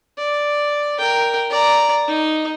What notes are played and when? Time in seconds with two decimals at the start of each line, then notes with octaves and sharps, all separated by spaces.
0.18 D5
0.99 A#4 G5
1.50 D5 A#5
2.08 D#4